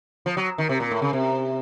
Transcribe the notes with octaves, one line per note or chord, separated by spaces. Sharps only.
F3
F#3
D#3
C3
A#2
A2
C#3
C3